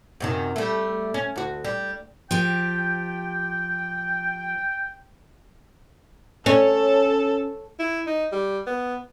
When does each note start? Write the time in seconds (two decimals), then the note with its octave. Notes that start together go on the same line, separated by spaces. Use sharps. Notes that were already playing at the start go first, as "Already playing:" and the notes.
0.20 F#2 C3 D#3
0.56 G3 A3
1.14 C#4
1.36 D2 F#4
1.64 G3
2.31 F3 G4 G5
6.46 C#4 A4
7.79 E4
8.06 D#4
8.32 G3
8.67 B3